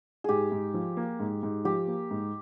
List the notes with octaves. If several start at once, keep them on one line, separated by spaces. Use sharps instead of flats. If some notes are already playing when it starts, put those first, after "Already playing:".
G#2 G4 G#4
G#2
F3
A#3
G#2
G#2
F3 G4
A#3
G#2